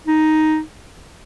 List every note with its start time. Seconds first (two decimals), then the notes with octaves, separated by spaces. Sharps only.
0.07 D#4